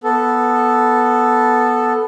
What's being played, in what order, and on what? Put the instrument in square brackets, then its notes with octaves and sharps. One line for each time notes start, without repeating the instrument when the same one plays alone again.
[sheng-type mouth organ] B3 A4